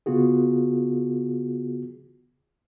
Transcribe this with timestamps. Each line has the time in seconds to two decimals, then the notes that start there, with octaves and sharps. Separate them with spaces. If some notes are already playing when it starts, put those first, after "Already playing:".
0.06 C#3 B3 F4 F#4 G#4